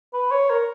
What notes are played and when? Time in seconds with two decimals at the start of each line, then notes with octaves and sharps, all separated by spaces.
0.13 B4
0.31 C#5
0.50 A#4